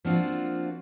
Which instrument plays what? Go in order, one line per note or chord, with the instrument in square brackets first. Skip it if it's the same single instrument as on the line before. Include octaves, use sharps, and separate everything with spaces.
[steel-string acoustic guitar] F3 A#3 C4 D4 F4 F#4